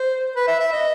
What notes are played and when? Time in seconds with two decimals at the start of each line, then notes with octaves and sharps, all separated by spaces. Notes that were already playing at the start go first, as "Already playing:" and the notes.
Already playing: C5
0.36 B4
0.48 E5
0.60 E5
0.73 D#5